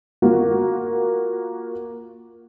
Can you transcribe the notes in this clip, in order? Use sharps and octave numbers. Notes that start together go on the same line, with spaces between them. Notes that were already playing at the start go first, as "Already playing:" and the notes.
A#3 F4 F#4